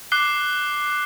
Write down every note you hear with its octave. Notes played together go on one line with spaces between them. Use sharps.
D6 F#6 C7 G7